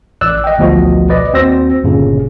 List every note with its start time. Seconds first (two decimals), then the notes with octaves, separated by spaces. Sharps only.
0.21 A1 D5 E6 F#6
0.44 D#5 G5
0.58 A1 D2 B2 F3 F#4 D#5
1.10 B4 D5 D#5
1.33 D#2 C4 F#4 C5 E6 A#6
1.84 G1 A#2 C#3